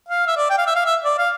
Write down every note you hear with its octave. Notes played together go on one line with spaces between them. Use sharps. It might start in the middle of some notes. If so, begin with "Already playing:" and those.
F5
E5
D5
G5
F5
E5
F5
E5
D5
F5